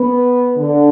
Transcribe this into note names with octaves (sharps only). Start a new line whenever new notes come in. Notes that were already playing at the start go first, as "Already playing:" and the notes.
Already playing: B3
D3